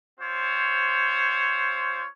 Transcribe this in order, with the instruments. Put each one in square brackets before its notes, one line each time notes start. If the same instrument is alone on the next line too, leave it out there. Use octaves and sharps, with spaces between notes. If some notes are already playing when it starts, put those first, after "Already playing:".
[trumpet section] C4 F4 C5 C#5